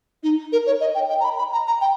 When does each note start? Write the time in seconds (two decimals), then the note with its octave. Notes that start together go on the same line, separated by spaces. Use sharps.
0.23 D#4
0.53 A#4
0.67 C#5
0.81 D#5
0.95 G5
1.09 G5
1.20 A#5
1.24 B5
1.38 B5
1.52 A#5
1.67 A#5
1.81 G5